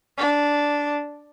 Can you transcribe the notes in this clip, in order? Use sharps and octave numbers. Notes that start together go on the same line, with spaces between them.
D4